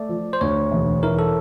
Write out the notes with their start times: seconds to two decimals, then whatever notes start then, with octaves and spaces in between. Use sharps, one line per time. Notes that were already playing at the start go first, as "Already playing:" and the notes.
Already playing: A3 D5
0.09 F3
0.33 C5
0.41 D2 C#5
0.71 E1
1.03 E3 A#4
1.19 A4